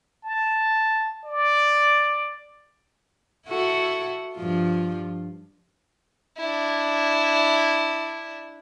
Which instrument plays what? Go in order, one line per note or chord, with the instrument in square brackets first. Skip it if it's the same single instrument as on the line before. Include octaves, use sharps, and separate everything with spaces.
[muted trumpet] A5
D5
[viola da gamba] E4 F#4 A4
G2 F3 F4
[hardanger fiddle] D4 E4